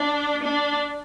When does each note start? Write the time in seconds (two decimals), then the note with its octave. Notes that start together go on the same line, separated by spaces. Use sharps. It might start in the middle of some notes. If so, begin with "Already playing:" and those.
Already playing: D4
0.43 D4